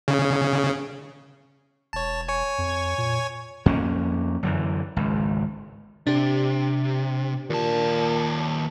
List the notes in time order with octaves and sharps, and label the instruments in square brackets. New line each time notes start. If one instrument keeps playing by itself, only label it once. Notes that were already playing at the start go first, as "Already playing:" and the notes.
[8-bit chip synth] C#3
[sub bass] E1 [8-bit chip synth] C#5 A5
[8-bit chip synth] C#5 G#5 C#6
[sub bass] F2
A#2
[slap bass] F2 A#3 C#4
F#2 D3 E3
G#1 C#2
[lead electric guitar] C3 [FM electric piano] D4 G4
[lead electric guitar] D#2 A5 [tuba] A#2